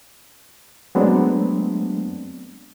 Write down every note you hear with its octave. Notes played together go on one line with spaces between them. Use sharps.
F#3 G#3 A3 B3 C4 D4